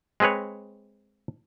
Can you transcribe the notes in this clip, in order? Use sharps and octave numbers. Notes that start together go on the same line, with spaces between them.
G#3 C4 G#4 B4 C#5